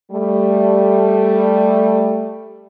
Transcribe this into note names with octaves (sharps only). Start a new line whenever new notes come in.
G3 A3